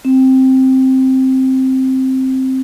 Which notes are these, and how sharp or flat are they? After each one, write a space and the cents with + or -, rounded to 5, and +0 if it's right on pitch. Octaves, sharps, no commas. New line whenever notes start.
C4 +5